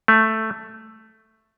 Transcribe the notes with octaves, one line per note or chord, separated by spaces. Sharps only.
A3